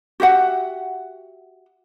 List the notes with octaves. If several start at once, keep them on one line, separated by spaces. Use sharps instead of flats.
F#4 G4 E5 F#5